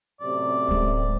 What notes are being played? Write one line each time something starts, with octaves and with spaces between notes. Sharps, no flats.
F#2 A2 C3 D5
D1 G#3